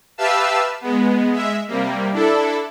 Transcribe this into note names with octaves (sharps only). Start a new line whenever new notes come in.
G4 B4 E5 F5 A5 E6
G#3 B3
G#3 E5
C3 G3 A#3
D4 E4 A4